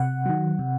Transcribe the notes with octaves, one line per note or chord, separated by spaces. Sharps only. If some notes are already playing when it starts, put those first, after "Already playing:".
Already playing: C3 F#5
D#3 F#3
C3